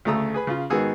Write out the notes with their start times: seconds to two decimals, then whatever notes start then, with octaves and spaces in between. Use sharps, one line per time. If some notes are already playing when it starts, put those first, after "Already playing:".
0.05 D2 C#3 A3 A#5 D#6 E6
0.34 G#4 B4 B5
0.47 C#3 F4
0.70 G#2 D#3 B3 F#4 G#4 E6